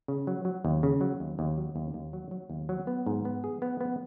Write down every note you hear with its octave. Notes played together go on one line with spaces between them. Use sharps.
C#3
F#3
F#3
D#2
C#3
F#3
D#2
D#2
F#3
D#2
D#2
F#3
F#3
D#2
F#3
B3
G#2
B3
G#4
B3
B3